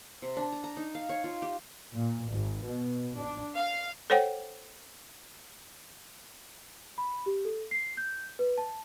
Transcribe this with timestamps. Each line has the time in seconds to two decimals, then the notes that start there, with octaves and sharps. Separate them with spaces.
0.22 C3
0.37 D4
0.52 A#5
0.64 A#5
0.77 D#4
0.95 F5
1.09 C#5
1.24 F4
1.42 G4
1.93 A#2
2.30 G#1
2.66 B2
3.18 D4
3.56 F5
4.10 A4 C5 C#5 F#5 G5
6.98 B5
7.26 G4
7.45 A4
7.71 C7
7.97 G6
8.39 B4
8.58 A5